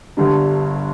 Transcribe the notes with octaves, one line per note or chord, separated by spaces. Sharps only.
G1 G2 D3 G3 D4